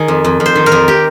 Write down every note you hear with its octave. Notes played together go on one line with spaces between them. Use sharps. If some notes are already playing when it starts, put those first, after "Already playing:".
Already playing: D#3 G#4
F2
F2
F2
C5
D#3
A#4
F2
G4